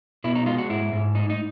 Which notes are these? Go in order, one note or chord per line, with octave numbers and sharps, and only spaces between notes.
B2 E4
D#4
G#3 F4
F#4
G#2 E4
G#2
A2 D#4
D#4